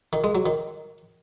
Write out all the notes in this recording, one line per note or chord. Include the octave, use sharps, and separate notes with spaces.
D#3
G#3
F#3
D#3